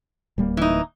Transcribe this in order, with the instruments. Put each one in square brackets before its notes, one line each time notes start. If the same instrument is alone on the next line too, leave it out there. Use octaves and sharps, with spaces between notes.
[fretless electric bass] D1 G3 A#3
[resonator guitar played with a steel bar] E3 D#4